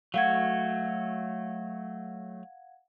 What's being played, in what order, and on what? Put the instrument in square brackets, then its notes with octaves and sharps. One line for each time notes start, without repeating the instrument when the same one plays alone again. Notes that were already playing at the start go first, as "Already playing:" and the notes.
[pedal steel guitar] F#3 A3 F#4 [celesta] F5 F#5 G#6